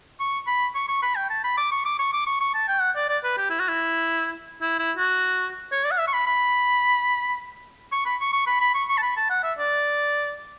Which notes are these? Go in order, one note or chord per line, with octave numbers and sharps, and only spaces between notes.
C#6
B5
C#6
C#6
B5
G5
A5
B5
D6
C#6
D6
C#6
D6
C#6
C#6
A5
G5
F#5
D5
D5
B4
G4
E4
F#4
E4
E4
E4
F#4
C#5
D5
F#5
E5
C#6
B5
B5
C#6
B5
C#6
C#6
B5
B5
C#6
C#6
A5
B5
A5
F#5
E5
D5